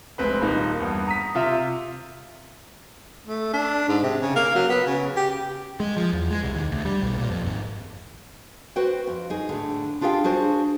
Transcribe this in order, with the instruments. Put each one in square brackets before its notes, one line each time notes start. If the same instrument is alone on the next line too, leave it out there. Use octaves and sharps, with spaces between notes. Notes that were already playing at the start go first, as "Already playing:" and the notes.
[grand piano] F1 G#3 C4 B4 B5
D#1 A#3 D#4 B5
E2 G2
A#5 D#6 B6
C3 F4 E5
[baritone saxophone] A3
D4
G#2
C3
C#3
A#3
F#3
B3
C#3
G4
[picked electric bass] G#3
F3
E2
G#3
C2
D#2
D2
G3
B1
A#2
F2
G#1
[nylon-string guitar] F#4 B4 C5 G5
F2
D#4 G#4
A2 D3
D4 F4 G4 G#4 F5 G5
D4 F#4 G#4 C5